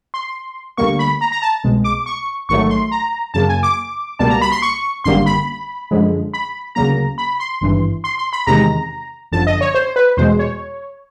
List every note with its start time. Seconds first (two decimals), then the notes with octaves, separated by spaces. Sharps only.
0.14 C6
0.77 D2 D3 G3 A#3 C#6
0.99 B5
1.21 A#5
1.32 A#5
1.42 A5
1.64 C2 B2 G#3
1.84 D6
2.06 C#6
2.49 A1 G#2 D#3 F#3 A3 C#6
2.70 C6
2.91 A#5
3.34 F#2 C#3 F#3 A#3 A5
3.49 G#5
3.63 D6
4.19 C#2 B2 G3 A#3 A5
4.30 A#5
4.41 B5
4.52 C6
4.62 C#6
5.04 G#1 F#2 D3 G3 A#3 C6
5.26 B5
5.91 F#2 D3 F3 G#3
6.34 B5
6.75 D2 C#3 F#3 A#3 A#5
7.18 B5
7.40 C6
7.61 G#1 G2 E3
8.04 C6
8.18 C6
8.33 B5
8.47 E2 C3 D#3 G#3 A#5
9.32 G1 F#2 D3 F3 A5
9.47 D#5
9.61 C#5
9.75 C5
9.96 B4
10.17 E2 B2 G#3 C5
10.39 C#5